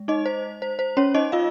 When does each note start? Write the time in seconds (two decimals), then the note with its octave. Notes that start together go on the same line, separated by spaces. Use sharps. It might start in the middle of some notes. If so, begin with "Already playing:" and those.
Already playing: G#3
0.08 D#4 D#5
0.26 C5
0.62 C5
0.79 C5
0.97 C#4 C#5
1.14 D#4 D#5
1.32 F4 F5